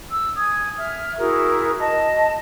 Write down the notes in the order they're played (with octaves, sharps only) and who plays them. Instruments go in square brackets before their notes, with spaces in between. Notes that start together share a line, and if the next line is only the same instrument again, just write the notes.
[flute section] E6
G#5 D#6 G#6
E5 F6
E4 F#4 G#4 A#4
D#5 A5